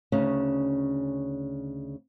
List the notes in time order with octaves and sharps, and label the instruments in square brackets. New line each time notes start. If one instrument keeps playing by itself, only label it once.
[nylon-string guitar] D2 C#3 C#4 D#4